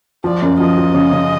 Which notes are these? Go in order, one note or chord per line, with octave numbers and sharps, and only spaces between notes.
F3 D5
F#2
F3 D#5
F3
C#3
C#3